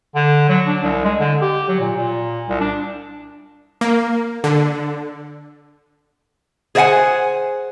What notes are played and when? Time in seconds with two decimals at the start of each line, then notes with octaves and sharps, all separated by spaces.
0.15 D3
0.49 F#3
0.66 D4
0.83 C2
1.05 G#3
1.19 D3
1.41 G4
1.68 F#3
1.80 A#2
1.96 A#2
2.48 C2
2.61 D4
3.81 A#3
4.44 D3
6.75 G#4 C5 D5 F5 F#5 G#5